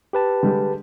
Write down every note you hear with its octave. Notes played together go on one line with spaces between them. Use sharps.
G4 B4 A5
D3 G3 G#3